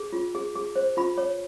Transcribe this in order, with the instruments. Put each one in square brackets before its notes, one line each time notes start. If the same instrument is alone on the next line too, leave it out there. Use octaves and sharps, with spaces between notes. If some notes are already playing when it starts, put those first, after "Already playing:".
Already playing: [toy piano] G#4
F4
G#4
G#4
C5
F4 B5
C#5